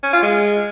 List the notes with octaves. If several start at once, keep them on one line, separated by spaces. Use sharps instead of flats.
C#4
F4
G#3